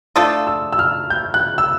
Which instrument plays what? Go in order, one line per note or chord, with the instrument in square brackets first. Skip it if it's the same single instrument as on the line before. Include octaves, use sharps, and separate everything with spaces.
[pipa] A3 D4 F4 A4 [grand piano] D#6
[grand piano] E6
E6
F6
G6
F#6
E6